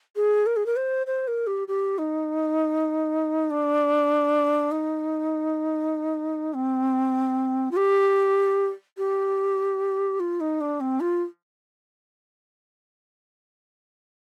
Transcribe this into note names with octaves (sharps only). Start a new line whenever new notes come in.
G#4
A#4
G#4
A#4
C5
C5
A#4
G4
G4
D#4
D4
D#4
C4
F4
G4
G4
F4
D#4
D4
C4
F4